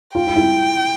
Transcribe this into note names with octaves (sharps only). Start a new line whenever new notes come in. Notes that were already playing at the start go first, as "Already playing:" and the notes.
F4 G5
F4
E4